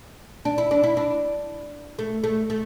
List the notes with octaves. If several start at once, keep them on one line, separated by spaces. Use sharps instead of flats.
D4
E4
D4
E4
D4
A3
A3
A3